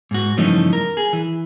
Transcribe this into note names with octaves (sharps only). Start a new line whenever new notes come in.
G#2 F#4
G2 C#3 E3 F3 A3 D#4
A#4
G#4
E3